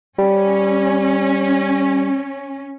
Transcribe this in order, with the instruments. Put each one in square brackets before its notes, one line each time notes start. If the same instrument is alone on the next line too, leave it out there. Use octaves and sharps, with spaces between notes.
[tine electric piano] G3 [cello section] C#4